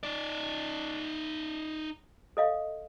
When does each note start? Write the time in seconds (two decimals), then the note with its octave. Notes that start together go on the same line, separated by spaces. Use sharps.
0.03 D#4 D5
2.37 A4 D#5 F5